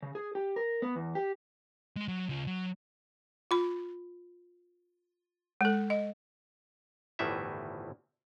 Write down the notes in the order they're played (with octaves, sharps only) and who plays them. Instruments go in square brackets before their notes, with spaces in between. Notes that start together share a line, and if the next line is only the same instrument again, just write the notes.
[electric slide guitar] C#3
G#4
G4
A#4
B3
E2
G4
[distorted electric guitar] G#3 C6
F#3
C#3 F4
F#3
[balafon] F4 B5
G#3 A4
D#5
[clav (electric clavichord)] G1 D2 A2 D#3 E3 E5